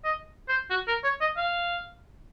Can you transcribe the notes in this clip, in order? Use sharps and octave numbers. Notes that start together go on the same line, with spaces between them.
D#5
C5
F#4
A#4
C#5
D#5
F5